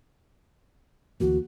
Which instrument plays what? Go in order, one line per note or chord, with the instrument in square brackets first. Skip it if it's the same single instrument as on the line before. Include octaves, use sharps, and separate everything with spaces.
[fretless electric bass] D2 E3 A#3 [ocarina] F#4